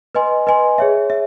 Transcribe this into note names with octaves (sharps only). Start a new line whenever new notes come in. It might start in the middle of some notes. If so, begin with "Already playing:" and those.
B4 D#5 G#5 C6
B4 D#5 G#5 C6
G#4 C#5 E5
E5